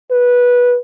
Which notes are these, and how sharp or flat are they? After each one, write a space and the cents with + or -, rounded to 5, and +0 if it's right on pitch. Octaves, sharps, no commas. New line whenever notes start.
B4 -15